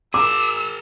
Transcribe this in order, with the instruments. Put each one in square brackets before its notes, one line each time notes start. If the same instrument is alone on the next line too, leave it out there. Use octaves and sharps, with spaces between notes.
[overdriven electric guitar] G#4 A#4 [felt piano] D6 [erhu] E6